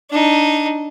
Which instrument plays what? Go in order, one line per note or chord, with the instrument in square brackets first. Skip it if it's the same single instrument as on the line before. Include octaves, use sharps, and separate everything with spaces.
[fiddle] D4 D#4